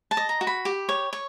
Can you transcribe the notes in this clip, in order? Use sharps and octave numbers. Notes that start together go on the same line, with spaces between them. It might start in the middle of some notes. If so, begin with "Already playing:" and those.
A5
D#5
A#5
F#4
B5
G4
C#5
C#5